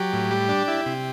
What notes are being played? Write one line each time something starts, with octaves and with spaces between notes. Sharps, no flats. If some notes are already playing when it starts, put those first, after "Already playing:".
Already playing: F#3 G4
A2
G3
D4
E4
C3